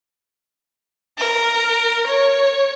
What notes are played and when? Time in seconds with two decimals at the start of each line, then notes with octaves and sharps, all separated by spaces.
1.18 A#4
2.07 C#5